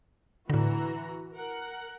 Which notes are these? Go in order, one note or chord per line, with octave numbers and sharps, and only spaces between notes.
A2 D3 E3 F#4 A#5
A#4 F#5